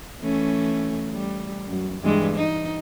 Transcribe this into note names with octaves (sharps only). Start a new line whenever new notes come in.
E3 A3 C#4
G3
F#2
G2 E3 G#3
D#4